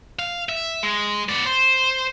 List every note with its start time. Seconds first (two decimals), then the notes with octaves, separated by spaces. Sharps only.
0.19 F5
0.49 E5
0.83 G#3
1.29 B3 D5
1.46 C5